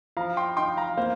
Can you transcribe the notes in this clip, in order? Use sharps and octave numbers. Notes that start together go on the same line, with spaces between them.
F3 F5 A#5
G5 C6
D#4 G5 C6
F5 A#5
A#3 C5 F5